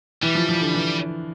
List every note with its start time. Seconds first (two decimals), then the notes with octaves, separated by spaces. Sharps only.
0.22 E3 G3
0.35 F3
0.49 F3
0.61 D3
0.75 E3